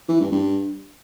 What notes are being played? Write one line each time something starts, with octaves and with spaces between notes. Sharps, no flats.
E3
G2
G2